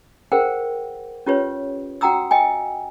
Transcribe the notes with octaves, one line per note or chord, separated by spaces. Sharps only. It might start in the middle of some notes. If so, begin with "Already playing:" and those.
G#4 A#4 C5 F#5 G5
C#4 F4 G4 B4 C#5
F#4 F#5 G5 A#5 D#6 E6
D#5 G5 G#5